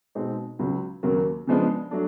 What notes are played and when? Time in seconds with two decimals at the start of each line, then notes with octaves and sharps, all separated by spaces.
0.15 B2 G#3 C4 D#4
0.59 C#2 C#3 F#3
1.03 D#2 C#3 F#3 A#3
1.47 C#3 F3 G#3 B3 D4
1.91 F#3 A3 D4